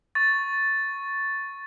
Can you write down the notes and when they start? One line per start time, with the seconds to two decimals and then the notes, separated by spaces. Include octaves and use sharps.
0.15 C#6 A6